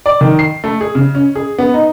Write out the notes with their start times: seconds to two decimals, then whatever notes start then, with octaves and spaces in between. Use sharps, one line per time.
0.06 D5
0.21 D#3
0.39 C7
0.64 A3
0.81 G#4
0.95 C#3
1.15 C#4
1.35 G#4
1.58 B3
1.74 D#4